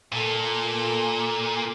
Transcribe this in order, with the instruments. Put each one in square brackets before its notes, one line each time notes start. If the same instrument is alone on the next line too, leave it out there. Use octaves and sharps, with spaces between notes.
[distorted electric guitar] A#2 [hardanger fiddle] A4